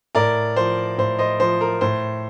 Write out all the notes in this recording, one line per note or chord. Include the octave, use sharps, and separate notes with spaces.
A2 A#4 D5
F3 C5
A2 C5
C5 D#5
F3 C5
A#4
A2 C5